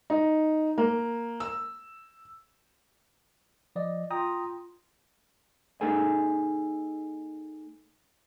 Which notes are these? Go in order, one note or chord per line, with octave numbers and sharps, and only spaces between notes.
D#4
A#3
E6
F3 D5 D#5
F4 G5 A#5 D#6
A#3 D#4 G#4 A4 G#5